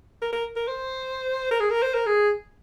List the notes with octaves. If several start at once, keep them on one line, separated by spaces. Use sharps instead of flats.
A#4
A#4
A#4
C5
A#4
G#4
A#4
C5
A#4
G#4